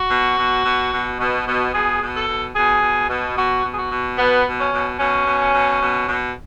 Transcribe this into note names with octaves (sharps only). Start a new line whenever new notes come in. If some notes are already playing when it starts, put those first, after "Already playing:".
Already playing: F#4
B2
B2
B2
B2
B2
B2
B2 G#4
B2
A4
B2
B2 G#4
B2
B2
B2 F#4
B2
G#4
F#4
B2
B2 B3
B2
C#4
B2
B2 C#4
B2
B2
B2
B2